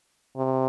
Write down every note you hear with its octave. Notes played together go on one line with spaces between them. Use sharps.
C3